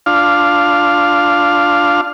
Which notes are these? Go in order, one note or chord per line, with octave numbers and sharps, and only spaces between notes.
D4 F4 F5